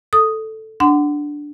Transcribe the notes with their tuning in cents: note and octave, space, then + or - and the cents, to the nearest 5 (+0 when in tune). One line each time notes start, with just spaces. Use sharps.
A4 +0 D#6 +0
D4 +0 F#5 +10 C6 -35